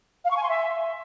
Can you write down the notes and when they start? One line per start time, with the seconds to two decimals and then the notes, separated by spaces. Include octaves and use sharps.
0.25 F5
0.31 C#6
0.37 G#5
0.43 C6
0.49 E5